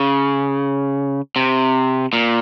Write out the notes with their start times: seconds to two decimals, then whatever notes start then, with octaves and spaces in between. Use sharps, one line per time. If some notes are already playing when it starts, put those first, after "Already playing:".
Already playing: C#3
1.36 C3
2.13 A#2